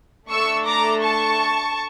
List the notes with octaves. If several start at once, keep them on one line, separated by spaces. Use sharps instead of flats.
A3 D4 A4 C#6 E6
A#5 D6
A5 C#6